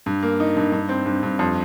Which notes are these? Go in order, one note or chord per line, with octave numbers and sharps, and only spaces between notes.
G2
A#3
D#4
G2
G2
C4
G2
G2
F2